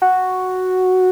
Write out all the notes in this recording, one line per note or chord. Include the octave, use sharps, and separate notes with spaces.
F#4